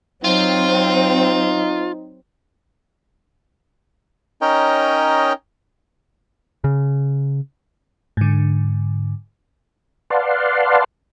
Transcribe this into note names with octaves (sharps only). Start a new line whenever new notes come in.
F#3 C4 D#4 F4
C#4 D#4 A#4 C#5 D#5 G5
C#3
G#2 D3
B4 D5 F5 F#5 A5 C6